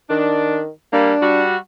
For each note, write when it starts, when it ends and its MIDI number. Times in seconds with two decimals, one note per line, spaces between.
0.10 0.69 51
0.10 0.60 62
0.93 1.14 55
0.93 1.14 58
0.93 1.44 62
1.22 1.58 55
1.22 1.58 66